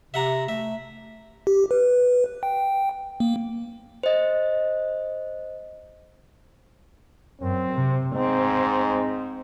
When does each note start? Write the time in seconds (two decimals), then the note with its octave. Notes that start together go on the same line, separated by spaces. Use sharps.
0.14 C3 E5 F#5 A#5
0.49 A3 E5
1.47 G4
1.71 B4
2.43 G5
3.20 A#3
4.03 C5 D#5
7.41 F#2 C4
7.74 C3
8.15 G#2 C4